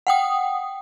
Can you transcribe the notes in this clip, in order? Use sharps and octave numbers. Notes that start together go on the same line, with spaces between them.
F#5 G5 D#6